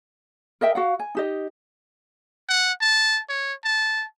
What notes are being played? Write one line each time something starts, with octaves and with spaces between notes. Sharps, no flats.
A#4 D#5 E5 G5
F#4 F5 F#5
G#5
D#4 G4 D#5
F#5
A5
C#5
A5